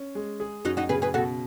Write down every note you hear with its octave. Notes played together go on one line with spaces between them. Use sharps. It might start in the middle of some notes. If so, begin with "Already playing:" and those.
Already playing: C#4
G#3
G#4
F#2 D#4 F#4
D#4 F#4
C#3 G#4 B4
G#4 B4
B2 F#4 A4